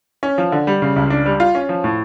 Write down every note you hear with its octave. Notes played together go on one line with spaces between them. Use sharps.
C#4
F3
D3
G3
C#3
C#2
D4
G3
F4
C#4
F3
A2